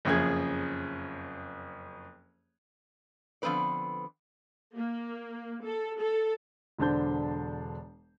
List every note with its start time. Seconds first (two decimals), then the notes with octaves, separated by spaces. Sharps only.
0.05 F#1 F2 C#4 G#4 G#6
3.42 D3 F3 B3 C4 B4 D5
4.75 A#3
5.64 A4
5.99 A4
6.78 E1 D3 D4 C5 A5 G6